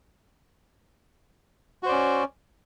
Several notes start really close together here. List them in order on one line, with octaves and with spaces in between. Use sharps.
F#4 C5 D5 C#4